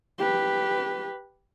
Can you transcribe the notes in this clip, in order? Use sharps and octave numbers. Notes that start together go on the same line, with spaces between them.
G4 B4